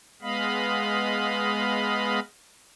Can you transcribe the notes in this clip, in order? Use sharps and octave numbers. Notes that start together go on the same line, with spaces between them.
G#3 B3 D#5 F5 B5